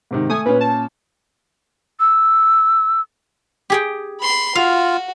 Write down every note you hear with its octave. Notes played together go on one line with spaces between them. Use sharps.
G#2 C3 D#3
A3 G#5 D#6
A#2 C#4 B4
A5
E6
G4 G#4 G5
B5 C6
F4 F#4 F5